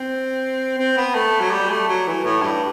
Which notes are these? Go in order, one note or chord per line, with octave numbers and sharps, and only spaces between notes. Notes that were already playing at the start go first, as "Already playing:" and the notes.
Already playing: C4
C4
B3
A3
F#3
G3
A3
F#3
E3
A2
G2